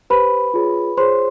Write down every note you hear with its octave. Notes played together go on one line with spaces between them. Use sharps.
G4 B4 C5 B5
F4 G#4 C#5
F4 G#4 C5 C#5 C6